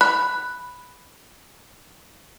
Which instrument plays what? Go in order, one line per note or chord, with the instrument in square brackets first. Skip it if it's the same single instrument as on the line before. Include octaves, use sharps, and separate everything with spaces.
[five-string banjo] B5 [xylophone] F#6